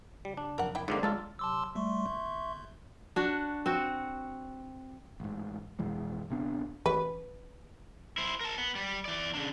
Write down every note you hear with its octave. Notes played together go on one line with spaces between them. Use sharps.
C#3 G3
D4
F1 F#3 A#4 F#5
A#3 E4 G5
G#2 D3 A#3 C4 F4 D5 D6
D3 F#3 G#3 F4 A4 A5
C3 F#3 A5 C6 D6 E6
G3 A3 E5 C6 C#6
G1
D4 F#4
C4 F#4
A1 G#2
F2 B2 E3 G#3
D1 C3 B3 D4
A1 B4
E4 C5
A#4 A5
B3
G3
E3 D5
C#3 D4